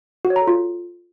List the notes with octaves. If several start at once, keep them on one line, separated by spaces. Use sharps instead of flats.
F#4
C#5
A#5
A4
F4